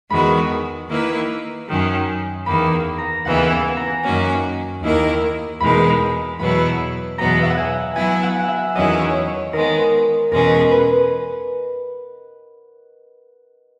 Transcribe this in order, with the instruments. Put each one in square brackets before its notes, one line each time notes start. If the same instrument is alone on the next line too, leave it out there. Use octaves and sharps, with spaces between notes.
[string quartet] E2 D#3 G#3 B3 F#4 [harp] B5
[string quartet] D#3 A#3 E4 B4
F#2 D#3 F#3 C#4
[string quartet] E2 D#3 A#3 [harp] B5
[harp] A#5
[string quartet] D#2 C#3 E3 B3 E4 [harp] F#5
[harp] G#5
A#5
[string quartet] F#2 D#3 A#3 C#4 F#4
D#2 D#3 A#3 E4 A#4
[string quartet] E2 B2 G#3 D#4 A#4 [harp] B5
[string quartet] E2 B2 F#3 B3 E4 [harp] B5
[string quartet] E2 B2 F#3 B3 [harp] A#5
[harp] E5
F#5
G#5
[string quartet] F#3 B3 E4 [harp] G#5
[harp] F#5
F#5
E5
[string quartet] E2 D#3 F#3 C#4 E4 [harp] D#5
[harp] C#5
C#5
[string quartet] D#3 G#3 B3 [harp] A#4
[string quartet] E2 B2 G#3 C#4 [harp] A#4
[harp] B4